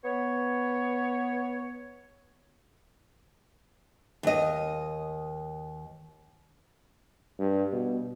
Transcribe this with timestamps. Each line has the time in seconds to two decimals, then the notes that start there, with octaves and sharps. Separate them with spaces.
0.04 B3 C#5
4.23 D#2 D#5
7.39 G2
7.72 B2